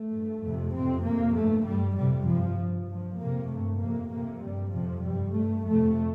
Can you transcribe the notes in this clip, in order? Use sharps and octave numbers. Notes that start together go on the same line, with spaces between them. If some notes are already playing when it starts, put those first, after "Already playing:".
Already playing: A3
G2
F2 C3
F2 C3 C4
F2 C3 A#3
G2 A3
G2 G3
F2 C3 G3
G2 F3
G2
G2 F3
F2 C3 A#3
G2 A3
F2 C3 A#3
F2 C3 A#3
G2 G3
F2 C3 F3
G2 G3
G2 A3
F2 C3 A3